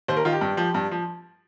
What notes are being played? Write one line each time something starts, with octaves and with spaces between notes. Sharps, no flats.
D#2 C5
A#4
D#3 F4
G4
G2
F3
G2
F3